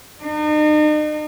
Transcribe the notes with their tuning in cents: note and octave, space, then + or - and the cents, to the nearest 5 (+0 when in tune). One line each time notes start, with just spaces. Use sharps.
D#4 -40